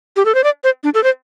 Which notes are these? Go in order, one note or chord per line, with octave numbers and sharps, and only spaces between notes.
G4
A4
C5
D5
C5
D4
A4
C5